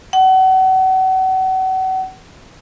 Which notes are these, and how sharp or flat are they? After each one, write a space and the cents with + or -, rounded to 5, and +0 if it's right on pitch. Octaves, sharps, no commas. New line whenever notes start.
F#5 +35